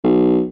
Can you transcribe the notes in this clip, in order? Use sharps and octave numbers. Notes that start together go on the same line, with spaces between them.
B1